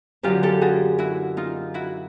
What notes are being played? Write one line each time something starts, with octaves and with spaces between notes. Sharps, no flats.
F#2 D3 F#3 F4 G4
G4 A4
F#4 G#4
E4 F#4
D#4 F4
E4 F#4